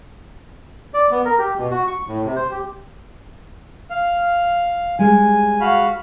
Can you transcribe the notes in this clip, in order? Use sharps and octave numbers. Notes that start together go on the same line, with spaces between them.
D5
B3
A#4
G4
B2
F#4
C#6
A2
C3
C5
G4
F5
G3 G#3 G#5
F#4 F5 B5